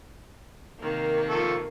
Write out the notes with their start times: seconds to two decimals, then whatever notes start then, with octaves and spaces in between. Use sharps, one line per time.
0.80 C3 D#3 A#3
1.29 F3 A4 C#6